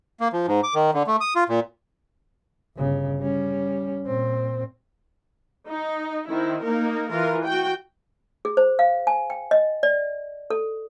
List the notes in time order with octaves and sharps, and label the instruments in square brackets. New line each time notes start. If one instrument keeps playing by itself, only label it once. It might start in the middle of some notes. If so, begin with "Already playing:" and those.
[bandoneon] A#3
F3
G#2
D6
D#3
D3
A3
D#6
F4
A#2
[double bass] G1 C#3
G3 C#4
A#2 C4
[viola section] D#4
D#3 C4 E4
A#3 D#4 A#4
E3 F4 A#4
F#4 G5
[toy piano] G#4
C5
F5
G#5
G5
D#5
D5
A4